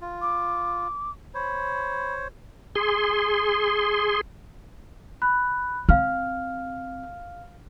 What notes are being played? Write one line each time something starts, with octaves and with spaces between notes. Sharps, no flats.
F4
D6
C5 C#5 B5
G#4 C6
B5 F#6
C4 F5 F6